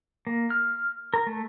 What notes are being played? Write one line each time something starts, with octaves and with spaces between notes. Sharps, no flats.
A#3
F6
A#4
A3